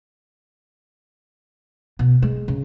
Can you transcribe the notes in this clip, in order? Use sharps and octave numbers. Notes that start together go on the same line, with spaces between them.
B2
G#3
C#3